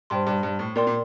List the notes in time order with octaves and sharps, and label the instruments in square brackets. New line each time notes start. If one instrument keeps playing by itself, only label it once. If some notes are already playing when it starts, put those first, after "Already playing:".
[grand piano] G2 [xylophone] C5 G5 C6
[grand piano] G2
G2
A2
[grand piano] A#2 [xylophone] A#4 D5 G5 C6
[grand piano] A#2